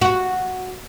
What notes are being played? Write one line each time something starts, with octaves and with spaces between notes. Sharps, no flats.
F#4